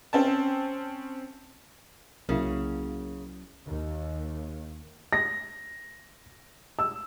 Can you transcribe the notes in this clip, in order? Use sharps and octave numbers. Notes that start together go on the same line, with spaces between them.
C4 C#4 A5
C2 C#3 F#3 A#3 C#4 E4
D#2
A#6
E6